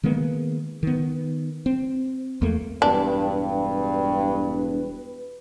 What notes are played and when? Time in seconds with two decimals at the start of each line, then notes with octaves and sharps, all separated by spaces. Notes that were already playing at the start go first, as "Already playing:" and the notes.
0.04 D#3 G#3 A#3 B3
0.83 D#3 B3
1.66 C4
2.42 E2 A3 A#3
2.82 E1 G2 D4 B4